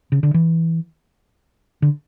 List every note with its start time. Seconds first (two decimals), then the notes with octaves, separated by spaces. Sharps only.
0.12 C#3
0.23 D3
0.34 E3
1.82 D3